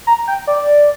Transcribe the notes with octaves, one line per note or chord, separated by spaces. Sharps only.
A#5
G5
D5